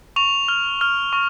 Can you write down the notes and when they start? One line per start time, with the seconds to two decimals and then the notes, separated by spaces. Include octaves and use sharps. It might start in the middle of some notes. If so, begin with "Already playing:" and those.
0.16 C#6 F7
0.48 F6
0.81 F6
1.13 C#6